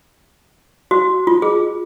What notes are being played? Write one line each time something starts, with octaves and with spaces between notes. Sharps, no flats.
F#4
F4
G#4